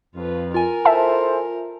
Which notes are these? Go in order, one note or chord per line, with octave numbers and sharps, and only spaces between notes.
F2 F4 B4
F4 A#4 G#5
E4 A4 C5 E5 A5